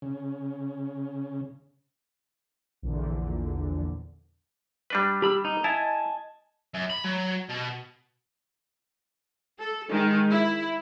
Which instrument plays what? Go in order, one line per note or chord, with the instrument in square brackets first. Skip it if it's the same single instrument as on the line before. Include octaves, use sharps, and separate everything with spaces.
[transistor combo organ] C#3
[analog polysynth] A#1 E2 A#2 D3
[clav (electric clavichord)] G3 D4 B4
[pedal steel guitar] G4 B5 E6
D#4
[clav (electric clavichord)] E4 [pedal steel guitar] D#5 G#5 A5
[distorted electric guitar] F#2
B5
F#3
B2
[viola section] A4
D#3 G#3
E4